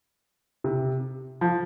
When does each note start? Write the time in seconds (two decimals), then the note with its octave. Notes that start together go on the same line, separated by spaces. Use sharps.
0.64 C3
1.41 F3